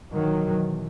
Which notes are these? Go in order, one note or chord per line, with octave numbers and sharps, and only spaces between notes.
E2 B2 D#3 F#3